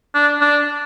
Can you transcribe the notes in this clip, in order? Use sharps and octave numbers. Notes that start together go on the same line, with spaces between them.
D4
D4